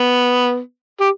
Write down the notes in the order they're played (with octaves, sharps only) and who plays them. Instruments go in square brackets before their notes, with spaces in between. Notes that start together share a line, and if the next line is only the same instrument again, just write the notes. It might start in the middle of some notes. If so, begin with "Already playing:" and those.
Already playing: [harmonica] B3
G4